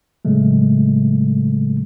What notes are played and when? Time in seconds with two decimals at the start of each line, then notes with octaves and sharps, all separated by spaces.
0.25 A2 C#3 F#3 G#3 A3